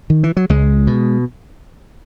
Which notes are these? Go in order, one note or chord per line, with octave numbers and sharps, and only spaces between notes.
D#3
E3
F#3
C#2 G#3
B2